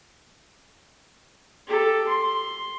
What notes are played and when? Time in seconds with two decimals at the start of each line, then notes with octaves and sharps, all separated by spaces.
1.67 G4 A4
2.07 C6